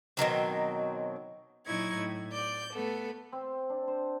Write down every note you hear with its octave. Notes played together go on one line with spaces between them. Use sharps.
B2 D#3 F#3 C4
A#2 F#3 D#4 E4 C#6 G#6
A2
D5 G6
A3 B3 A4
C4
D4
C5